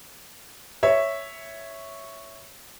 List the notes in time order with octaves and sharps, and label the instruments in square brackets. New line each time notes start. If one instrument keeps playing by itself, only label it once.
[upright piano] C#5 E5